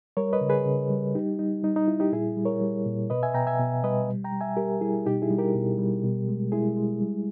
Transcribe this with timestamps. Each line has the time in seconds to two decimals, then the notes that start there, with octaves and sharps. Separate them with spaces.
0.17 G3 A#4 C#5
0.33 B4 D#5
0.41 C#3
0.49 G#4 B4
0.66 C#3
0.90 G3
1.15 G3 D#4 G4
1.39 G3 D#4
1.63 G3 D#4
1.76 D#4
1.88 G3 E4
2.00 D#4 G4
2.12 A#2 E4 G#4
2.37 G3
2.45 A#4 C#5
2.61 G3
2.86 A#2
3.10 B2 B4 D#5
3.23 E5 G#5
3.34 B2 G5 A#5
3.47 E5 G#5
3.59 B2
3.83 G3 B4 D#5
4.09 G3
4.24 G5 A#5
4.32 G3
4.41 E5 G#5
4.57 G3 G4 A#4
4.81 G3 E4 G#4
5.06 B2 D#4 G4
5.22 E4 G#4
5.30 G3
5.38 G4 A#4
5.55 B2
5.78 G3
6.04 B2
6.28 G#3
6.52 G#3 E4 G#4
6.77 G#3
7.01 G3